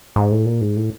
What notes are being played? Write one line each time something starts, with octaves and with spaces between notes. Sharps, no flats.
G#2
A2
A#2
G#2
A2